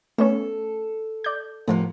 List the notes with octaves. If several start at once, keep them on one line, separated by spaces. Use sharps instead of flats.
A3 B3 C#4 A4
D5 G6
A2 C3 F3 A#3 B3